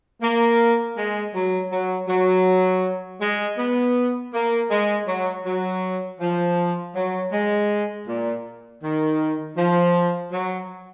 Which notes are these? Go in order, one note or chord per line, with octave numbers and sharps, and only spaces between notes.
A#3
G#3
F#3
F#3
F#3
G#3
B3
A#3
G#3
F#3
F#3
F3
F#3
G#3
A#2
D#3
F3
F#3